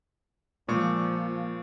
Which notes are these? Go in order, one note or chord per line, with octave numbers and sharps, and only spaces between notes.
A#2 F3 G#3 A#3 C#6